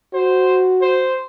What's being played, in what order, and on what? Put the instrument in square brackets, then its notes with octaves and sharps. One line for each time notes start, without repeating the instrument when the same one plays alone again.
[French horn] F#4 [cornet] C5
[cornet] C5